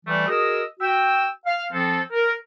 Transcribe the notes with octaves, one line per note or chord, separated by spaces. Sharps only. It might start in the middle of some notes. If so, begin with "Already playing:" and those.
E3 G3 A3
F#4 G#4 A#4 D#5 D#6 E6
F#4 G5 E6
F5
F3 C4 A4
A#4